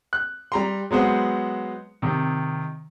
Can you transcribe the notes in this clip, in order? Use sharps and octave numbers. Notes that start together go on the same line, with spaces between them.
F#6
G3 A#5 C6
F#3 G#3 B3 C5 F#5
C3 D#3